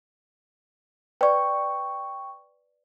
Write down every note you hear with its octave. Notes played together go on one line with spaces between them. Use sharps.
B4 D5 G5 C#6